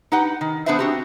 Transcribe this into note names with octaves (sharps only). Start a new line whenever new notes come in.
D#4 G4 B4 F#5
D#3
B3 D4 G#4 B4 C5 E5
C4 F#4 G4